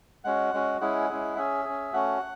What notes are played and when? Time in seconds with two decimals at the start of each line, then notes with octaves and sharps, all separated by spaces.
0.24 G#3 C#4 F#4 F#5
0.54 G#3 C#4 F#4
0.81 G#3 C#4 E4 G#4 F#5
1.09 G#3 C#4 E4 G#4
1.37 C#4 G#4 E5
1.65 C#4 G#4
1.93 A3 C#4 F#4 F#5